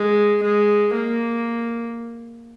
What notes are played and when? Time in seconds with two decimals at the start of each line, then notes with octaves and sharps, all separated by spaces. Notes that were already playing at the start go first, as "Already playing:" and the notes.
Already playing: G#3
0.43 G#3
0.94 A#3